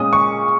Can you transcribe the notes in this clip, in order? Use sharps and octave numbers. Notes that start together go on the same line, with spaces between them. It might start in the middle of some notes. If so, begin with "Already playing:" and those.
Already playing: A#2 G#3 C#4 D#6
C#6